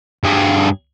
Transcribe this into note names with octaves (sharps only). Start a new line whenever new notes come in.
G2 G#4